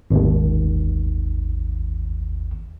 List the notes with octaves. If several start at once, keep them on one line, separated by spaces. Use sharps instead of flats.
G#1 D#2